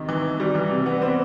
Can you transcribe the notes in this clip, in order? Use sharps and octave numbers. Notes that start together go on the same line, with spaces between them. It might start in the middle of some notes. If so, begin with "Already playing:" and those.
Already playing: C3 D#3
E3
G3
E3
C3
B3
C4